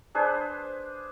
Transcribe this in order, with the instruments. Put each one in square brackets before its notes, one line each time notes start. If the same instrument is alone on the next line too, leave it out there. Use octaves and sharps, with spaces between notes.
[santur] D4 G#4 B4 C5